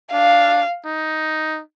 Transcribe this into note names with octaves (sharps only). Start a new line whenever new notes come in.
D4 F5
D#4